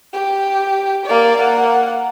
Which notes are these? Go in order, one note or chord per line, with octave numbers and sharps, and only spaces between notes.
G4
A#3 D5
A#3 F#5